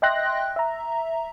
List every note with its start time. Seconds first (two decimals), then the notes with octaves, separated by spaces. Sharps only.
0.02 D#5 E5 G5 C6 F#6 A#6
0.56 E5 A#5